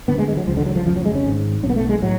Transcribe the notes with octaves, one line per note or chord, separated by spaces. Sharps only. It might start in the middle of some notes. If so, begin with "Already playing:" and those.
D2 D3 B3
G#3
G#3
F#3
C#2 C#3 F3
D3
F#3
F3
F1 F2 C#3 F3
F#3
G#3
C#4
G#1 G#2
B1 B2 B3 C#4
A3
G#3
A2 F#3